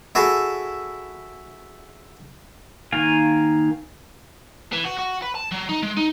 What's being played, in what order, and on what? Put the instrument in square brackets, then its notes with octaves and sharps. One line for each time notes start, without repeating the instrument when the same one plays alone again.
[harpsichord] E4 F#4 G#4 A4
[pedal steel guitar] D#3 A#3 F5 G#5
[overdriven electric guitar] E3
F#4
F#4
B4
A5
F#3
D#4
G#3
D#4